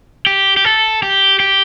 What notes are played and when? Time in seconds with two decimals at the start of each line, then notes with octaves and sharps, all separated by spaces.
0.26 G4
0.57 G4
0.65 A4
1.03 G4
1.40 G4